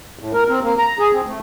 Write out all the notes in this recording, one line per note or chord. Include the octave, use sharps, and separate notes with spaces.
A2
A#4
C4
A#3
A#5
G#4
C4
A3